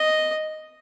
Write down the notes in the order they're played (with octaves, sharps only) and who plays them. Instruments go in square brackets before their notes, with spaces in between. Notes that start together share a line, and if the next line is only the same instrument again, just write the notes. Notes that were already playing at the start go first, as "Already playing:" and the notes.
Already playing: [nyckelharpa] D#5